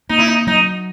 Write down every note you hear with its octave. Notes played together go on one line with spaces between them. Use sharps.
A#3 D#4
E4
D#4
F#3 D#4